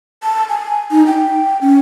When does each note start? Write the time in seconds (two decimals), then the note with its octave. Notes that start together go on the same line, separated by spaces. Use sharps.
0.23 A5
0.49 G#5
0.91 D#4
1.07 G5
1.61 C#4